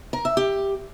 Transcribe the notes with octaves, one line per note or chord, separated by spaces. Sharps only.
A#4
E5
G4